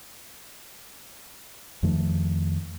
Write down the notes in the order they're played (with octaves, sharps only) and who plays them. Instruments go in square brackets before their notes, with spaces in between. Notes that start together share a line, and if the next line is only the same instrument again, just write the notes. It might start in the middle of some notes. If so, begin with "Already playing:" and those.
[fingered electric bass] F2 D#3 F3 A3